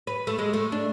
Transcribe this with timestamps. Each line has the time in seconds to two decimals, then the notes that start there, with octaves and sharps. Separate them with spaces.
0.07 B4
0.27 A3
0.39 G#3
0.54 A3
0.72 D4